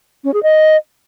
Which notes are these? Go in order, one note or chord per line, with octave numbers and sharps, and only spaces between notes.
C#4
G#4
D#5